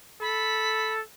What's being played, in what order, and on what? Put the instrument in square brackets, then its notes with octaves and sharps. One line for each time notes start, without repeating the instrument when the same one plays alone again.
[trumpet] A4 [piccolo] B5